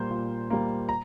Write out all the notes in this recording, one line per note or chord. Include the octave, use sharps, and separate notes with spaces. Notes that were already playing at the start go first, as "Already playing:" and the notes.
Already playing: A#2 G3 A#3 C5
A#2
G3 A#3
A#5